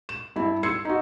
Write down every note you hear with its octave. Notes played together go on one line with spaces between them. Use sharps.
E7
G2 E4
C6 E6 G#6 C7 C#7
D#4 F#4